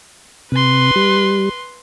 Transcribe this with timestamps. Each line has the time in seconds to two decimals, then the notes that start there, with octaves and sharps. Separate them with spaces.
0.52 C3 B4 C6
0.96 G3